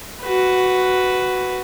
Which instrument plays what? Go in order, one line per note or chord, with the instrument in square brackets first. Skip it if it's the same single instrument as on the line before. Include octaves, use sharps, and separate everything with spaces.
[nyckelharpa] F#4 B4